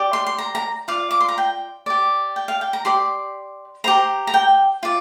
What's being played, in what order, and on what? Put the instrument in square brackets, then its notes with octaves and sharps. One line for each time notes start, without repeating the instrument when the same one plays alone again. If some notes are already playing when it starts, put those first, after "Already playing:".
Already playing: [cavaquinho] G4 D5
C6
C6
A#5
A#5
F4 D5 F5
D6
C6
A#5
G5
G4 D5
G5
F5
G5
A#5
G4 D5 C6
G4 C5 A#5
A#5
G5
F4 D5